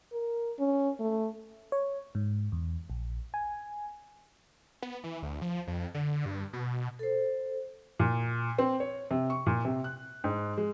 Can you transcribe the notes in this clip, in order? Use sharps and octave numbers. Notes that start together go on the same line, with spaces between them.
A#4
C#4
A3
C#5
G#2
E2
A#1
G#5
B3
E3
D2
F3
F2
D3
G2
B2
A4 C5
A#2
C4
C#5
C3
C#6
A#2
C3
F#6
G#2
G#3